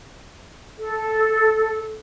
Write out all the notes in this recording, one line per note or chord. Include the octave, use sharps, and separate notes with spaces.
A4